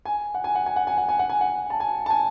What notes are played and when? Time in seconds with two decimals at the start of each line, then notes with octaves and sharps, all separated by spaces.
0.05 G#5
0.34 F#5
0.44 G#5
0.55 F#5
0.66 G#5
0.76 F#5
0.87 G#5
0.98 F#5
1.09 G#5
1.19 F#5
1.30 G#5
1.41 F#5
1.70 A5
1.80 G#5
2.06 A5
2.10 G#5